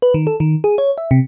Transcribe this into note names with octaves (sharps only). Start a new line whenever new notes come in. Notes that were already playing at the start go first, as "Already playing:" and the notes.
B4
D#3
A4
D#3
G#4
C#5
E5
C3